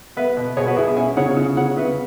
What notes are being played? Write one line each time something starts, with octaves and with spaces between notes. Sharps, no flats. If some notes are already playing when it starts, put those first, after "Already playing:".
B3 B4 E5
B2
B2 G#4 C#5
F#4 B4
B2 E4 G#4
E4 G#4
C#4 E5 G#5
C#3 C#5 F#5
C#3
C#3 C#5 F#5
C#3 B4 E5